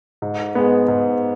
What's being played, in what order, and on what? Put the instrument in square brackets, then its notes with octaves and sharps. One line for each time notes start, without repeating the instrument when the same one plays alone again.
[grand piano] G#2
G#3 B3
G#2